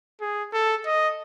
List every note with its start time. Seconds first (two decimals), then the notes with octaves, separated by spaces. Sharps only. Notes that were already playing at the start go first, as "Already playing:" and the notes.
0.21 G#4
0.53 A4
0.86 D#5